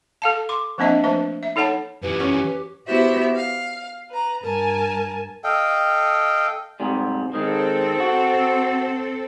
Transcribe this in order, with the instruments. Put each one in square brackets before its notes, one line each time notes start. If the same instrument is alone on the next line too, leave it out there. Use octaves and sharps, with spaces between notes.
[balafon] A4 F5 A5
C6 D6
F3 A#3 C4 D4 D#5 E5
F3 A3 D4 B4 E5
E5
D#4 A4 C#5 F#5 A5 B5
[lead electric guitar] F#2 E3 [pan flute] G4 [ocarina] B4
[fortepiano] C#4
[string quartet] B3 E4 F#4 G4 C5 E5
F5
B4 A#5
G2 A#4 G#5 A5
[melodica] A4 D#5 F5 G5
[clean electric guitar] G#2 C3 G3
[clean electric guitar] D#3 G#3 [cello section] C4 A4
[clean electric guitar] F#4